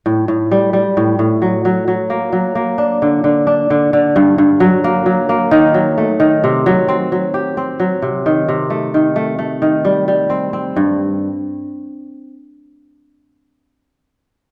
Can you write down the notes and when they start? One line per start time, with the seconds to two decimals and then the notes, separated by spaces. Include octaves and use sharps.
0.06 A2
0.28 A2
0.51 G3
0.73 G3
0.97 A2
1.19 A2
1.42 F#3
1.65 F#3
1.88 F#3
2.10 A#3
2.33 F#3
2.55 A#3
2.78 D4
3.02 D3
3.24 D3
3.47 D4
3.70 D3
3.93 D3
4.16 G2
4.38 G2
4.60 F#3
4.84 A#3
5.06 F#3
5.29 A#3
5.51 D#3
5.74 F#3
5.98 A3
6.20 D#3
6.44 C3
6.66 F#3
6.88 C4
7.12 F#3
7.34 G4
7.57 C4
7.80 F#3
8.02 C3
8.26 D#3
8.48 C3
8.70 A3
8.94 D#3
9.16 A3
9.39 A3
9.62 D#3
9.85 G3
10.08 G3
10.30 C4
10.53 C4
10.76 G2